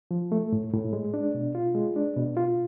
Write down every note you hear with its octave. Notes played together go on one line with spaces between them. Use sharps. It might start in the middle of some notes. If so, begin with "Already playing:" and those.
F3
A3
A2
A2
G#3
D4
B2
F4
G#3
D4
B2
F4